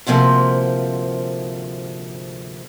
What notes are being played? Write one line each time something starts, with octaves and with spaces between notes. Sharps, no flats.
D2 G#2 C3 F3 A#3